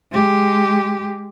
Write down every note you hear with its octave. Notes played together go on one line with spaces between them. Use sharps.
G#3 G4